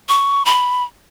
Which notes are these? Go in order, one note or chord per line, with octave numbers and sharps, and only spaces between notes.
C#6
B5